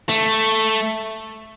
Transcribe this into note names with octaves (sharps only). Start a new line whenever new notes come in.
A3